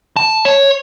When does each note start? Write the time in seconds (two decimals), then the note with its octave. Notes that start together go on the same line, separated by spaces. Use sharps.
0.17 A5
0.45 C#5